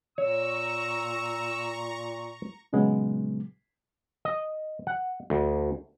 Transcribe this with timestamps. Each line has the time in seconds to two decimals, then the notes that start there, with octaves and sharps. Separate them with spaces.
0.18 A#2 C#5 A#5 C#6 E6
2.73 A#2 C#3 F#3 G#3 B3
4.25 D#5
4.87 F#5
5.30 D2